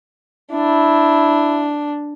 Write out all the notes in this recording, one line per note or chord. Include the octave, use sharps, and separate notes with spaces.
D4 E4